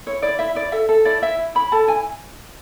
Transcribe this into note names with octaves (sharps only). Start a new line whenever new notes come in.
E4 C#5
E4 D5
E4 E5
E4 D5
A4 E5
A4
E4 D5
E4 E5
E4
E4 B5
A4 A5
E4 G#5